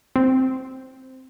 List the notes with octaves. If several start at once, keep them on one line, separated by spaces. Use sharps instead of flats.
C4